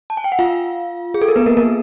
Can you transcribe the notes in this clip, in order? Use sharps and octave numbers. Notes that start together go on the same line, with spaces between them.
A5
G#5
G5
F#5
F4 F5
G#4
A4
A#4
B3 B4
A#3 A#4
A#3 A#4